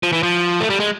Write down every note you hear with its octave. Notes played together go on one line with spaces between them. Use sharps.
F3
E3
F3
A3
G3
G#3